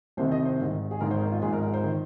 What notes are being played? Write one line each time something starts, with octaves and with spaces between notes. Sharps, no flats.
C2 C3 D#3 C5
D#5
C5
G#1 G#2 D#3
G#4
G#1 G#2 D#3 A#4
C5
A#4
F4
G#1 G#2 F3 G#4
A#4
A#4
C5
D#3